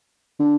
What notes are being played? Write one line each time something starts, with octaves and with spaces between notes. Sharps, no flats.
D3